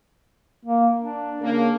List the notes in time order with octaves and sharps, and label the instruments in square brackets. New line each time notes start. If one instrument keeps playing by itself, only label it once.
[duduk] A#3
D4
[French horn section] C#3 A#3